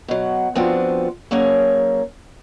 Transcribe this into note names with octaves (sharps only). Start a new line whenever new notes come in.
B2 F#3
F3 B3 C4 D4 F4 F#4
F#3 A#3 C#4 G#4 A#4